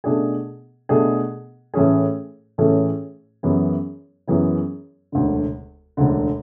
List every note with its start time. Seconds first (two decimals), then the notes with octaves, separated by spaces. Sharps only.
0.04 B2 A3 D4 G#4
0.89 B2 A3 D4 G#4
1.74 A2 E3 A3 C#4 G#4
2.58 A2 E3 A3 C#4 G#4
3.43 F#2 E3 B3 E4 G#4
4.27 F#2 E3 B3 E4 G#4
5.12 E1 D2 D3
5.97 E1 D2 D3